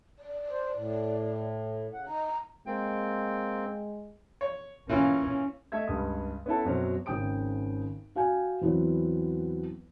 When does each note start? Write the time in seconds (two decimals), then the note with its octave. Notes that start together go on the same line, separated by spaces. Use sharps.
0.19 D5
0.50 C5
0.75 A2
1.94 C#3 F#5
2.07 D#4 A#5
2.67 G#3 A#3 C4 G5
4.41 C#5
4.89 E3 A#3 C#4 F4
5.72 A3 D#5 E5 G#6
5.88 C#2 G2 D#6
6.46 B3 C#4 E4 A4
6.65 F#2 B2 F#3 C4
7.06 G#1 C#3 G5 D#6 D7
8.16 F#4 F5 G5 G#5
8.61 E2 E3 F#3 B3 C4